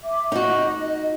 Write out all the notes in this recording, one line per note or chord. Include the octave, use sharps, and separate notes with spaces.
E5 D6
D#4 F#4 D#5